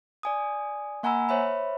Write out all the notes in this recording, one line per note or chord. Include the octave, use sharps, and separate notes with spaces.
D5 G#5 D#6
A#3 F#5 G#5 A#5 B5 E6
C5 C#5 E5 B5